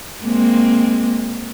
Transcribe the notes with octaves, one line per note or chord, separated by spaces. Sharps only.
G#3 A#3 C4